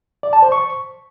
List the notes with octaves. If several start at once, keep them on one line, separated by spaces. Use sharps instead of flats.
D5
A5
C5
C#6